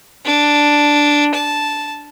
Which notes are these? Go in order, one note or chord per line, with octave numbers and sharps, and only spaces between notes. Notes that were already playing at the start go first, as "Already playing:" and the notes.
D4
A5